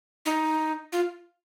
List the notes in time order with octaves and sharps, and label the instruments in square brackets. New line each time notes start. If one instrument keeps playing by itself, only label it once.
[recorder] D#4
F4